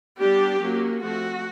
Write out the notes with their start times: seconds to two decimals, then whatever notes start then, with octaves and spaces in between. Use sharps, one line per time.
0.20 G3 B3 D4 G4
0.61 F#3 A#3 C#4
1.01 F3 A3 C4 F#4